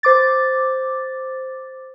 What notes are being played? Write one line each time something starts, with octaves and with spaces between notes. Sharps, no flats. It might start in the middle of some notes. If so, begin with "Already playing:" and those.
C5 D6 A6